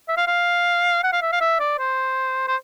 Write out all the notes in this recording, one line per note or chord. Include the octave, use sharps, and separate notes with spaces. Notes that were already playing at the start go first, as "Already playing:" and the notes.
E5
F5
F5
F#5
F5
E5
F5
E5
D5
C5
C5